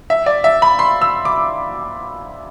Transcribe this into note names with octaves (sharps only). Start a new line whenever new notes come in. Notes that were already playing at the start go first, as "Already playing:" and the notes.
E5
D5
E5
B5
C6
E6
D6